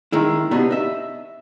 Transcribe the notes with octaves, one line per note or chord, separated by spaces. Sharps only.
D#3 G#3 E4
C3 B3 D4 D#4 F#4
D#5 E5